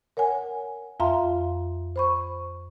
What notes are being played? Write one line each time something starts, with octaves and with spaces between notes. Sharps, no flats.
A#4 C#5 F#5 G#5
F2 F4 E5 F5 A#5 C6
C5 B5 C#6